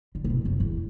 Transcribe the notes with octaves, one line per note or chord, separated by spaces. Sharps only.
D3
A2
B2
F#2
E2